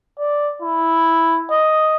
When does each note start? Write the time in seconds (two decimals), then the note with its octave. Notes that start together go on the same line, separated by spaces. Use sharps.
0.19 D5
0.62 E4
1.51 D#5